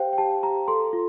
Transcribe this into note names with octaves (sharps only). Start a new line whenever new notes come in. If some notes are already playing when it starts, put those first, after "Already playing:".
Already playing: G4 C5 F5 G5
G5
G4 A5
G4 A#5
A4 C6
F4